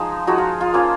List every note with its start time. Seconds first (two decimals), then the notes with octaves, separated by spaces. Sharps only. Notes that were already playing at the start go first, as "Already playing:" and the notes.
Already playing: F3 G#3 D#4
0.27 F3 G#3 D#4 F#4
0.38 F4
0.61 F4
0.73 F3 A#3 C#4 F4